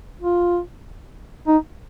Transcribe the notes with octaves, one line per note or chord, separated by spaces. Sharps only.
F4
D#4